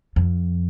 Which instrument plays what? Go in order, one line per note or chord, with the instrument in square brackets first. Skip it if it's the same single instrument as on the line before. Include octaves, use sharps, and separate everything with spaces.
[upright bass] F2